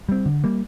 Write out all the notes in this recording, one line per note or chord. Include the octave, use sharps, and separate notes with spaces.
G3 C4
D3
G3 A#3